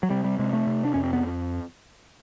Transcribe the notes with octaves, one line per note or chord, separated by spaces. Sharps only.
F#3
C3 G3
G3
C3 G#3
A3
C3
D4
F2 C#4
C4
B3